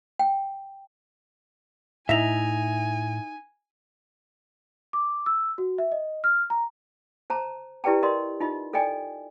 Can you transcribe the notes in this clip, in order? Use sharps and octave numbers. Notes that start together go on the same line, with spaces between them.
G5
A2 D#4 E4 E5 G#5 A#6 F7
D6
E6
F#4
E5
D#5
F6
A#5
C5 A5 A#5
E4 G4 B4 D5 G5 A5
A#4 D5 D#5 C6
D#4 F4 D#5
A4 D5 D#5 G5 G#5